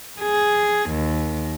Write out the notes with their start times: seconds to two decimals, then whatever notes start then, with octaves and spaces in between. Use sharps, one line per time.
0.21 G#4
0.91 D#2